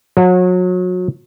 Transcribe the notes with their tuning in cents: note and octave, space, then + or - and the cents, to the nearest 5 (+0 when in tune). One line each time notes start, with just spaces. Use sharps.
F#3 -30